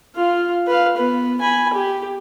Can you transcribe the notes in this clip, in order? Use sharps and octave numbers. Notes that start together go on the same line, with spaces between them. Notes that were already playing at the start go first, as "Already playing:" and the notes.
F4 F5
B4 F5
B3 B4
G#5 B5
G4